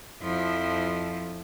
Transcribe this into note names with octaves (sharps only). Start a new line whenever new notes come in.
F2 F3 E4